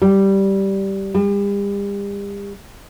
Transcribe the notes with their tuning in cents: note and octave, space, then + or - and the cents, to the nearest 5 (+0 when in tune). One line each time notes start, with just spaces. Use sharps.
G3 -10
G3 +40